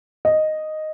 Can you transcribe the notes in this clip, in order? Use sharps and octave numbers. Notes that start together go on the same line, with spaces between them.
D#5